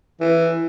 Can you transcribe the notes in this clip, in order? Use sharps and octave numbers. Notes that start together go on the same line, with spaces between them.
E3